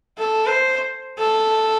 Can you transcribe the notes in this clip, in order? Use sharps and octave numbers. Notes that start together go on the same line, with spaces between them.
A4
C5
A4